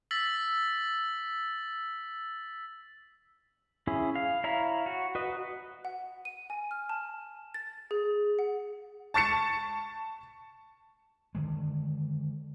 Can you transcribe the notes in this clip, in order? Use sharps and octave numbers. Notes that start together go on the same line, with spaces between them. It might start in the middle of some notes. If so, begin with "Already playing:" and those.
E6 A6 B6 F#7
C#4 E4 G#4
F5
E4 C#5 F5 A#5
F#4
F#4 B4 D#5
F#5
D#7
G#5
F6
A5
A6
G#4
F#5
A5 C#6 A6 C#7 E7
D3 D#3 G#3